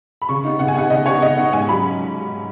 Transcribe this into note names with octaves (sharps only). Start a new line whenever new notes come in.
B5
C#3 C#6
B3 D#4
C#3 F#5
G#5
B3 D#4 F#5
C#3 D#5
B3 D#4 C#5
C#3 D#5
B3 D#4 F#5
G#2 G#5
F#3 C#4 B5